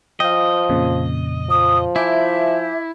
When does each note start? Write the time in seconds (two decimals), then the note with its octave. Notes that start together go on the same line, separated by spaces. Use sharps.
0.20 F3 D#5 F5 G5
0.69 F2 A#2 C#3
1.50 F3 D#6
1.96 E4 E5 G#5 D6 G6